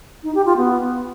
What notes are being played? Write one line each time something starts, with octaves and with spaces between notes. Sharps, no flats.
D#4
G4
F4
B3